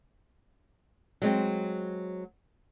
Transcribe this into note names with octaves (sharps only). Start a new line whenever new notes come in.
F#3 G#3 C4